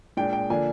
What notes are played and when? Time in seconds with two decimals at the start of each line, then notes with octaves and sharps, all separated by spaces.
0.17 A#2 G#3 D4 G5
0.33 G5
0.50 D3 F3 A#3 D4 G#5